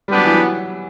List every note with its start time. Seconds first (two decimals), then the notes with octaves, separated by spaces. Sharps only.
0.08 G3 B3 D4 G4 B4
0.17 F#3
0.25 E3
0.33 F#3